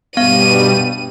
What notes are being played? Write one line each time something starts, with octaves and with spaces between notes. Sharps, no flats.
G2 B2 G3 B3 F5 D#7